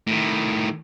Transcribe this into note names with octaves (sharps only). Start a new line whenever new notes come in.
A2 D#3